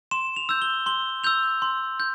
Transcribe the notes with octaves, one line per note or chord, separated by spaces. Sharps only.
C6 E7
F7
E6 G6
G7
C6 G7
E6 G6 F7
C6
G6